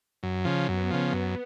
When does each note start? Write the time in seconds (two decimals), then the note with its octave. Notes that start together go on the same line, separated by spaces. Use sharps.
0.23 F#2
0.45 C#3 F3
0.68 F#2 B3
0.91 C#3 F3
1.13 F#2